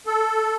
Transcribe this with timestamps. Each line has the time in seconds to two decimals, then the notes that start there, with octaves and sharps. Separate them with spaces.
0.06 A4